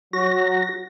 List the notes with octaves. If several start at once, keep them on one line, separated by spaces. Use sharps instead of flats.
F#3 F#4 A#6